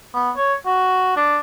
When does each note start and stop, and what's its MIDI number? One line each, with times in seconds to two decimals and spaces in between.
0.14 0.31 59
0.37 0.54 73
0.66 1.15 66
1.16 1.40 62